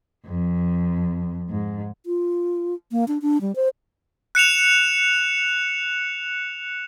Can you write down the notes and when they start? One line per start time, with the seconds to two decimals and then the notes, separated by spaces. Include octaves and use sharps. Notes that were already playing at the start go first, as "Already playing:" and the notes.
0.26 F2
1.49 G#2
2.06 F4
2.92 A#3
3.08 D4
3.22 D4
3.41 G3
3.56 C5
4.35 F#6 C#7 E7 F7